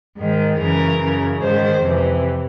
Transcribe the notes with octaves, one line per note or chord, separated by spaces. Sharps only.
G#2 D#3
F#2 C#3 E3 A#4
F#2 C#3 E3
G#2 D#3 C5
F2 C3 E3